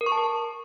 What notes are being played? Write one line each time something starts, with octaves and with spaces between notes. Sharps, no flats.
A#4
C#6
A5
A#4